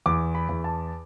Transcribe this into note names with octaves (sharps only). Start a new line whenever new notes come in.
E2 D6
B5
E2
A5